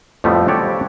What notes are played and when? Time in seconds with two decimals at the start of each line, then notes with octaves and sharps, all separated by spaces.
0.24 F2 A2 F3 G3 A3 B3
0.48 F#4 G4 A4 C#5 D5